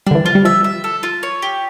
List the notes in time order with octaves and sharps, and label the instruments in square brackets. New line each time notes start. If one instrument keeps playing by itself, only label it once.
[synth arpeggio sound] D3 G3 [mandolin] D4
[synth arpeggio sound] E3
[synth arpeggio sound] F3 [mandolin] F4
[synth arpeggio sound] G3
[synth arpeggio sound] F3 [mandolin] E5
[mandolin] E5
A4
F4
C#5
G4